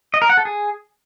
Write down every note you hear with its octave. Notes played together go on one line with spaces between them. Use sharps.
D#5
A#4
F#5
A4
G#4